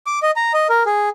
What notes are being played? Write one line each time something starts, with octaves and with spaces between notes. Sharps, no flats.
D6
D#5
A#5
D#5
A#4
G#4